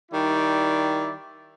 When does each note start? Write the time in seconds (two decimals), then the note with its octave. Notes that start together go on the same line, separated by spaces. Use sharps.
0.12 D#3 G3 E4 D5